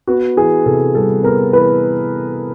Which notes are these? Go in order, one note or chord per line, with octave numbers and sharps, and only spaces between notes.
B3 F#4
E3 G#4
C3 A4
G3 A4
B3 A#4
E3 B4